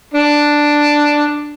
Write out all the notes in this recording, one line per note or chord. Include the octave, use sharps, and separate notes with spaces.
D4